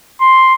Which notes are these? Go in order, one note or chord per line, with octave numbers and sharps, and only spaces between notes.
C6